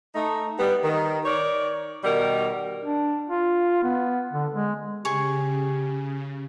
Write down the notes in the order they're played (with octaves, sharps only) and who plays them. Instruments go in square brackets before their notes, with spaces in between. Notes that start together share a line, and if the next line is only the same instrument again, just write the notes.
[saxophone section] A3 D#4
G3 B3
D#3
D#4 A#4 C#5 D5
B2 D#3 G3 A#4
[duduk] D4
F4
B3
D3
G#3
[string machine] C#3 [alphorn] G4 [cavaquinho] G#4 C#6